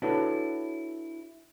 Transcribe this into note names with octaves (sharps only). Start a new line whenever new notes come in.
D4 E4 F#4 A4 B4 C#5